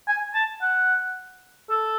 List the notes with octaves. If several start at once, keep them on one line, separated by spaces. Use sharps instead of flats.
G#5
A5
F#5
A4